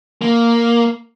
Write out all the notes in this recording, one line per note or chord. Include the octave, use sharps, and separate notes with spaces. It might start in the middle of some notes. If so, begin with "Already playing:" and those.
A#3